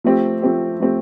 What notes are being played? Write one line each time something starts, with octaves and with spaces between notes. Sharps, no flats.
F3 A3 C4 G4
F3 A3 C4 G4
F3 A3 C4 G4